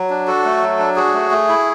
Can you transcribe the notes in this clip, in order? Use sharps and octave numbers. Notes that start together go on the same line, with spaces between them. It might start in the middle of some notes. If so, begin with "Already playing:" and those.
Already playing: F#3
D4
F#4 A4
A3
F#3
D4
F#4 G#4
A3
A3
E4